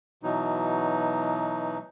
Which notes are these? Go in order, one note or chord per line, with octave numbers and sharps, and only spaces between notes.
B2 E3 F#3 D#4